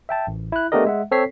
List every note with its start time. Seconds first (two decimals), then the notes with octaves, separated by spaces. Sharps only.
0.09 E5 G5 A5
0.27 A1
0.52 E4 F#6
0.72 A3 B3 D4 G4 A#4 D#5
0.85 G#3 E5 F#5
1.11 C4 A4 C#5 B6 C7